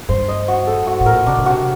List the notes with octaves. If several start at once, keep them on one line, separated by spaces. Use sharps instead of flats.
G2 C5
D#5
F#4
A4
F#4
A2
A#4
A#2
C3 D4
A#2
C3 F#4